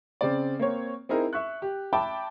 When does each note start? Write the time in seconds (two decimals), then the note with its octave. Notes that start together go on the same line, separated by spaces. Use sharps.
0.21 C#3 C4 D5
0.59 A#3 C4 C#5
1.09 C4 D#4 E4 G#4 A#4
1.33 E5 C#6 F#6
1.62 G4
1.93 E5 G5 A5 B5 D6